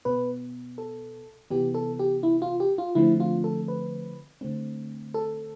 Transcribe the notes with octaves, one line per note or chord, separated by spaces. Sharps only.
B2 B3 B4
A4
C3 E3 B3 G4
A4
G4
E4
F4
G4
F4
D3 F3 A3 C4 E4
F4
A4
B4
D3 A3 C4
A4